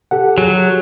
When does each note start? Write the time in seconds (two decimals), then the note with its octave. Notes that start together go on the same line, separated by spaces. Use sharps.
0.11 G4 A4 F#5
0.38 F#3 G#4